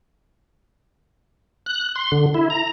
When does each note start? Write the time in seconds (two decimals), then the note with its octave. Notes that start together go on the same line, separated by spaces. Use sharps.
1.66 F#6
1.96 C6
2.12 D3
2.34 E4
2.50 A#5